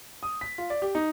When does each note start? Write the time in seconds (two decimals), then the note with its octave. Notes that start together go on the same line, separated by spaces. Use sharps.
0.23 D#6
0.41 B6
0.58 F4
0.70 D5
0.82 G4
0.95 D#4